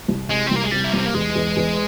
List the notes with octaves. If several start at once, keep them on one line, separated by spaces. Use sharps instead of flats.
C2
C3 G#3
C4
C2 A#3
G#3
C3 G3
E4
C2 C#4
C4
A#3
E2 G#3
E2
E2